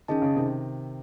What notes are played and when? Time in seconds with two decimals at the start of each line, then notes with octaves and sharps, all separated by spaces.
0.08 D#3 C#4 G#4 D#5 A5
0.22 C#3
0.36 C3 D#3